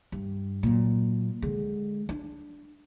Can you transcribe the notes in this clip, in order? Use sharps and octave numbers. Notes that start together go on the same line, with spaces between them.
G2
A#2 F#3
D3 G#3
D4